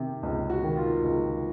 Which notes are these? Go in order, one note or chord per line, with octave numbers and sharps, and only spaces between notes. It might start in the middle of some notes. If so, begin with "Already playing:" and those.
Already playing: C3 D#3
C#2
F#4
D#3
F4
C#2